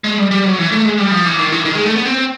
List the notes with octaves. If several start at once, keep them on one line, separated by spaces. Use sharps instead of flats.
G#3
G3
G3
F#3
E3
A3
G#3
G3
F3
E3
D#3
E3
D#3
G#3
A3
B3
C4